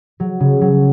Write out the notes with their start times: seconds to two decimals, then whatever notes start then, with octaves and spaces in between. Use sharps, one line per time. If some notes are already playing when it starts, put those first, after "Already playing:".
0.20 F#3
0.40 C#3
0.61 F#3